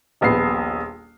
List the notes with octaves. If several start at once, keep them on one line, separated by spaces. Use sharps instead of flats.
D#1 A#1 B3 C7